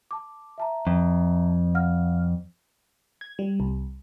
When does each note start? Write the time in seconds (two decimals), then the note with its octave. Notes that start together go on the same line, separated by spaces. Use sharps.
0.11 A5 D6
0.58 E5 A5 A#5
0.87 F2
1.75 F5 F#5 F6
3.21 G#6
3.39 G3
3.60 C2